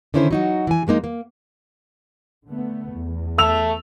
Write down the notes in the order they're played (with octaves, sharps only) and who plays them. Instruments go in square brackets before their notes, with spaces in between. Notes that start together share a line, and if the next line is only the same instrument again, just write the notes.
[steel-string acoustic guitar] D3 D#3 C#4 E4 A#4 C5
F#3 D#4 F#4
E3 G#5
F3 G#3 A#3 D#4
A#3
[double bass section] D3 A3 B3
E2
[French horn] A3 [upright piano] E6 F7